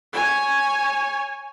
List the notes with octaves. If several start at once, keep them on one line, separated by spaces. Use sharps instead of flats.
C#5 G#5